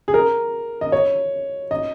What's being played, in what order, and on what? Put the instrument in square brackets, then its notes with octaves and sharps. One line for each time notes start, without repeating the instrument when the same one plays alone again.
[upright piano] G#4
A#4
D#5
C#5
D#5